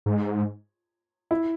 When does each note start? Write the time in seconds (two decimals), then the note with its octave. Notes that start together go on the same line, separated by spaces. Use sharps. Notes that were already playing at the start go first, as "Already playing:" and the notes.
0.06 G#2
1.31 E4